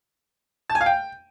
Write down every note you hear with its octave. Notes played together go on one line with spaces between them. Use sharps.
A5
G#5
F5
G5